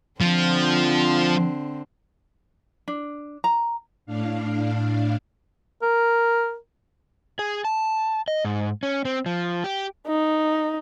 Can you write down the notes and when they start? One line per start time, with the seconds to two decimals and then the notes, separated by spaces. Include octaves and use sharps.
0.21 D3 F3 C4
2.88 D4
3.44 A#5
4.06 A2 D4 F5
5.82 A#4
7.39 G#4
7.65 A5
8.28 D#5
8.45 G#2
8.83 C#4
9.05 C4
9.26 F3
9.64 G4
10.07 D#4